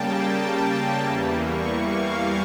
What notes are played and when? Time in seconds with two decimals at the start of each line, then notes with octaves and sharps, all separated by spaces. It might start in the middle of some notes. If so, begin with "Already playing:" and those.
Already playing: C#3 G3 A#3 G5 A5
0.99 E2 E3 G3 A#3
1.43 C#6
1.89 F5